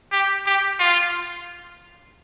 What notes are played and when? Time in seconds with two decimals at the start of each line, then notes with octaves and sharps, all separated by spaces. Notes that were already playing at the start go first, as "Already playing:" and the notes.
0.12 G4
0.46 G4
0.79 F4